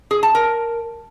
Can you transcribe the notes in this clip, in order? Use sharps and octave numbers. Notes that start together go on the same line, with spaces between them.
G#4
A5
A#4